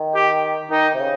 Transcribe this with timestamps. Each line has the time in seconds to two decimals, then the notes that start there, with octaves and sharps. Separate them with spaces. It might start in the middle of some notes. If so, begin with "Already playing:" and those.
Already playing: D#3
0.15 G4
0.71 D#3 D#4
0.94 C3
0.99 C#3